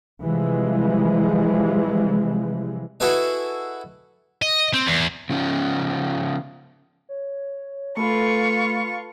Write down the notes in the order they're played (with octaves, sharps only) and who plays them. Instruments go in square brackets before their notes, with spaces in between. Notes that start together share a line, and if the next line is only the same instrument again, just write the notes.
[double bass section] C3 E3 F3 G3 G#3
[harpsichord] E4 F#4 G#4 A4 B4 D#5
[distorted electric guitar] D#5
C4
E2
[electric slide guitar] C#3 F3 C4 C#4 D#4
[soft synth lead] C#5
[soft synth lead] A3 [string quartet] F4 C#6 [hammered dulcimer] A4 B4